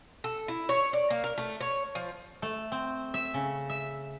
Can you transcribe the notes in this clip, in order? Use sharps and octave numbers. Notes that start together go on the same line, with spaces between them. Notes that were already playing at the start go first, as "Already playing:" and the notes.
A4
E4
C#5
D5
A#3
A#4
A3
C#5
F3
A3
C4
E5
C#3
E5